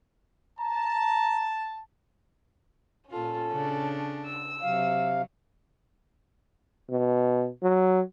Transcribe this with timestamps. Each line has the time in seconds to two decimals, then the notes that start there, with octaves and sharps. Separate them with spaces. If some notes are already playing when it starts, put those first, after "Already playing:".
0.60 A5 A#5
3.10 A#2 C#4 F4 A4
3.51 C#3 D4
4.26 E6
4.62 C3 F#3 F5
6.90 B2
7.63 F#3